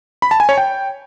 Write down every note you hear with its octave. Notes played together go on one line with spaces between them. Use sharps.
B5
A5
G#5
C#5
G5